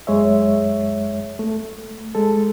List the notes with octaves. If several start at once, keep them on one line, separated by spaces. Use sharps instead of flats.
F#2 G#3 C#5 E5
A3
G#3 A4